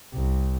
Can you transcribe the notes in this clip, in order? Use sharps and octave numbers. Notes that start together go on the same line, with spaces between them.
C2